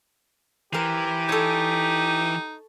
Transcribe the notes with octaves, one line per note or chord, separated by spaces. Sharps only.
E3 G4 A#4 C5
D#4 A4 C#5